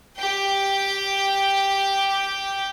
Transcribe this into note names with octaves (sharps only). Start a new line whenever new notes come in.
G4 G5